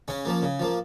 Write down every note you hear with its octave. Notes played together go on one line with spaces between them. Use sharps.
C#3 C#4
F3 A#3
C#3
F3 A#3